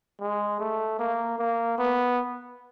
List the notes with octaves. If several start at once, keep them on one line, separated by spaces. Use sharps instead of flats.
G#3
A3
A#3
A#3
B3